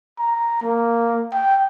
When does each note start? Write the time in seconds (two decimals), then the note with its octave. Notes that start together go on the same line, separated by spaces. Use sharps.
0.19 A#5
0.62 A#3
1.33 G5